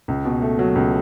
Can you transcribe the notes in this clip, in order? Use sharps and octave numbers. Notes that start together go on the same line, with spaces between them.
C#2
B2
A3
F#3
C#2